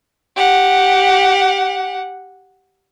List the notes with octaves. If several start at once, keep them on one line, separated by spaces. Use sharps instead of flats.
G4 F#5